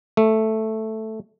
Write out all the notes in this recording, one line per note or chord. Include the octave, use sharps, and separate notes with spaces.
A3